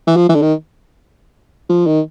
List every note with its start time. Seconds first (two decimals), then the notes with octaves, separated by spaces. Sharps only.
0.07 E3
0.16 F3
0.29 E3
0.35 D3
0.42 D#3
1.70 F3
1.87 D#3